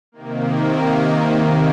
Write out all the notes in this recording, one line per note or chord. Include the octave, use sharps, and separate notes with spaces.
C3 D#3 A#3